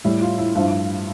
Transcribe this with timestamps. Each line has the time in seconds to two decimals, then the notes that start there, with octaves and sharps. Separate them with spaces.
0.04 A2 G3 E4
0.21 F4
0.39 E4
0.55 G2 F3 E4